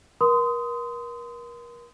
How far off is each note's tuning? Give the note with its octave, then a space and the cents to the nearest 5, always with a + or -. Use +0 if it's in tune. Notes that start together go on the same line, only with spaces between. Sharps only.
A#4 +35 C6 -30 D#6 +10